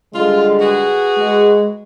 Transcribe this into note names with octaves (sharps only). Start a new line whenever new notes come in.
D3 G3 G#3 F4
F#4 G#4 B4
G#3